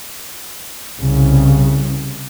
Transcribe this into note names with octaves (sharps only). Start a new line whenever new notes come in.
C2 C#3